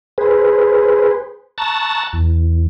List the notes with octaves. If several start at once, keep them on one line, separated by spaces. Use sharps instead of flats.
G#4 B4 C5
A5 A#5 C#6 E6 F#6 A6
E2